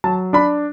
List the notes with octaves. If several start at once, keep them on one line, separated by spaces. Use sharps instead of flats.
F#3 A5
D4 B5